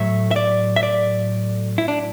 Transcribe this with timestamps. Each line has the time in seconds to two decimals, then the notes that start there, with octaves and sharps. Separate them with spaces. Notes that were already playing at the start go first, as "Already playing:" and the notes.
Already playing: A2 F#3 A3 E5
0.31 E5
0.36 D5
0.76 E5
0.83 D5
1.78 E4
1.88 D4